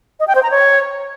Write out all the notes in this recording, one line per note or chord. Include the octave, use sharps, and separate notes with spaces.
D#5
G5
C5
A#5
C#5